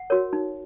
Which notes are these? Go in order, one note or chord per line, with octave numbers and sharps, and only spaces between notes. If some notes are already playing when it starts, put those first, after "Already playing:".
Already playing: F#5
F#4 A#4 C#5
D#4